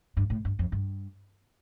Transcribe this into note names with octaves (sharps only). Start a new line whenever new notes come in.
G2
A2
G2
F2
G2